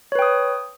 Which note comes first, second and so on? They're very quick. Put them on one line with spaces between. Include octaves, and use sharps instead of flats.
C#5 B4 G5 D#6